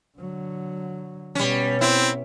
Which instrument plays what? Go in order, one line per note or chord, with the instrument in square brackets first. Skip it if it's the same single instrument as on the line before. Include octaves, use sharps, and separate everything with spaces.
[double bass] D3 F#3
[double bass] B2 B3 [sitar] G3 C#4
[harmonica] C4 [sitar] E4